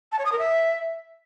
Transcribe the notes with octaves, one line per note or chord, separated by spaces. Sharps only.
A5
C#5
D#6
A#4
E5